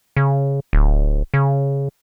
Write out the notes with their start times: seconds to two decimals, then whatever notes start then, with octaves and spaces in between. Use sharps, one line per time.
0.17 C#3
0.73 D1
1.34 C#3